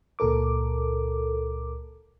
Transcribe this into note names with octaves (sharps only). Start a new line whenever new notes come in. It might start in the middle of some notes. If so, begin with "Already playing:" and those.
C#2 A#2 A4 A#4 D6